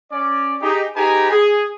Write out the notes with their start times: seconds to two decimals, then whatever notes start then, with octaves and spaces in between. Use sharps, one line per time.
0.12 C#4 D5
0.61 D#4 G4 G#4
0.96 D#4 G4 G#4 B4 G#5 A#5
1.31 G#4